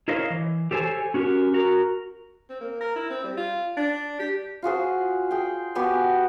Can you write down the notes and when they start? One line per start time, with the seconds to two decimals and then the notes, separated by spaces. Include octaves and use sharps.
0.08 E4 A#4 C5 C#5 D#5 F5
0.30 E3
0.71 G4 A4 C5 C#5 G#5
1.14 C#4 F#4 G4 A#4
1.54 F#4 A#4
2.49 C4
2.61 A#3
2.81 A#4
2.96 E4
3.10 C4
3.24 G3
3.37 F4
3.77 D4
4.19 G4
4.62 F4 F#4 G#4 C5
5.31 G#4 G5
5.75 B3 F#4 G4 G#5